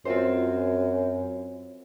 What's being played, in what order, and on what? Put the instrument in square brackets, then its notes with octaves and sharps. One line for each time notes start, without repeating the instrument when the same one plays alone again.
[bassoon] F#2 [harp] C4 F4 C5